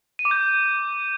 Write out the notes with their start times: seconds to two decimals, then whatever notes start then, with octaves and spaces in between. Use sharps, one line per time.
0.19 D#7
0.25 D6
0.31 G6